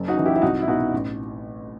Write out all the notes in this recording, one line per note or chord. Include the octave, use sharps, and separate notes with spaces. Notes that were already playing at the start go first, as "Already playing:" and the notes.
Already playing: F#1
D#4 F#4
F#2 E3
E4 G4
E4
C2 D#4 F#4
E4
B2 D#4 F#4
A1